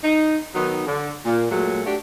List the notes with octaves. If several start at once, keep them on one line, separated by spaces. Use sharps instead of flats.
D#4
D#3 F#3 B3 D#4
D3
A#2
A#2 F#3 G#3 A3
A3 D4 F#4 G4